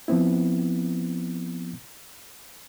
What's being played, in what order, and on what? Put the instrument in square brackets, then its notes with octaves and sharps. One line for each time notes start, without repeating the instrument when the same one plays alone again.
[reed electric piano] F3 B3 C4 E4